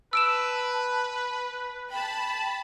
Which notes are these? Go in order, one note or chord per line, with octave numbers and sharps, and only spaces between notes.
B4 A5 E6 D7 E7
G5 A5 B5